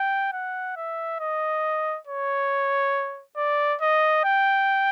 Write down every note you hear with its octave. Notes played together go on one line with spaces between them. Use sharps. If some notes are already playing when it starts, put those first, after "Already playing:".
Already playing: G5
F#5
E5
D#5
C#5
D5
D#5
G5